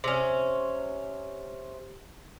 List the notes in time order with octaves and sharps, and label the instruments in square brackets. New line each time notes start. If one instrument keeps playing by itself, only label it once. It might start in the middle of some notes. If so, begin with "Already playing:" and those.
[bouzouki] C3 C#4